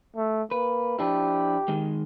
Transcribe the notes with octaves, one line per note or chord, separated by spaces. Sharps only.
A3
A#3 B4
F3 D4 E4 G4
D#3 G#3